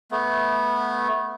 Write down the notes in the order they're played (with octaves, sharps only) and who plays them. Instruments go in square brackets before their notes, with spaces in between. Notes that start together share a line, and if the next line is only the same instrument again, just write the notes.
[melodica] A3 B3